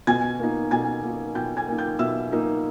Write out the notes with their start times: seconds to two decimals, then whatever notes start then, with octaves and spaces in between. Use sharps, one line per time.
0.07 B2 G#5 G#6
0.39 A#3 D#4
0.71 B2 G#5 G#6
1.03 A#3 D#4
1.35 B2 G5 G6
1.57 G#5 G#6
1.68 A#3 D#4
1.78 G5 G6
1.99 B2 E5 E6
2.32 A#3 D#4